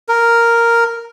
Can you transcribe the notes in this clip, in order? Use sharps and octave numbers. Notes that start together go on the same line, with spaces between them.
A#4